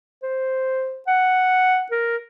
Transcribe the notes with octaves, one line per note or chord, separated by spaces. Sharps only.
C5
F#5
A#4